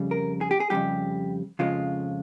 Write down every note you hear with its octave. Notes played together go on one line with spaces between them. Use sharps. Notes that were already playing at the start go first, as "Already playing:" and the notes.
Already playing: F2 C#3 G3
A#4
G#4
G4
G#4
F2 C#3 G3 G4
F2 C#3 F3 G#3 F4